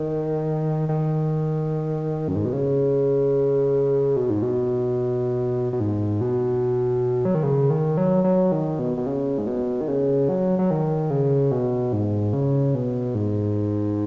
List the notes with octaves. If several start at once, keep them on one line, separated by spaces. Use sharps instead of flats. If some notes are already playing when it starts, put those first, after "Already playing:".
Already playing: D#3
D#3
F#2
G#2
B2
C#3
B2
G#2
B2
B2
G#2
B2
F#3
D#3
C#3
D#3
F#3
F#3
D#3
B2
B2
C#3
G#2
B2
D#3
C#3
F#3
F#3
D#3
C#3
B2
G#2
C#3
B2
G#2